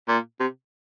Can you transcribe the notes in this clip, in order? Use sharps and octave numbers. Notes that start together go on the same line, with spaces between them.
A#2
C3